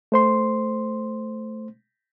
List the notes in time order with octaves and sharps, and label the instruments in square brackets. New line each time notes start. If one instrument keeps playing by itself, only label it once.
[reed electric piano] A3 C5 C6